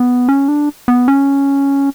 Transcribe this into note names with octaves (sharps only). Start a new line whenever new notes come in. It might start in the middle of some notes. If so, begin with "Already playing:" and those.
Already playing: B3
C#4
D4
B3
C#4